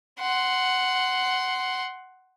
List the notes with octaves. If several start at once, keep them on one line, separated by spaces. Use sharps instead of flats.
F#5 C6